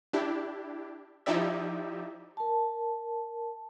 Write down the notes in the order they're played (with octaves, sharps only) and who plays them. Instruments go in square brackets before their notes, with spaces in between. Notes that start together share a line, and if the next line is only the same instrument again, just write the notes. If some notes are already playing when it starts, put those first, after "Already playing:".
[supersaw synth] D4 E4 G4
F3 D#4 E4 G4 D5 E5
[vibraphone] A#4 A5